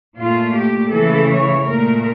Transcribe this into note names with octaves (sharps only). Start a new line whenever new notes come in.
A#2 A3 F4
G4
C#3 E3 A3 A4
C#5
A#2 A3 A#4